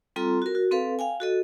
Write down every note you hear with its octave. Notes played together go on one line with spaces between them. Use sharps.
G3 C4 F4 A4 A#5 C6
F#4 A#4
F#4
C4 A4 B4 F5
F5 G5 G#5
F#4 A4 D#5